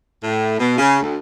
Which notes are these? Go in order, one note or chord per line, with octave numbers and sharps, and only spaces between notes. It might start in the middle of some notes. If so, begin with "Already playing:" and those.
A2
B2
C#3
D2